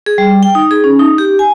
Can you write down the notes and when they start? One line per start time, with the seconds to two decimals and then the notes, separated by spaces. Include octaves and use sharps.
0.06 G#4
0.18 G3
0.43 G5
0.55 D#4
0.71 G#4
0.84 C#4
0.99 D#4
1.18 G4
1.39 G#5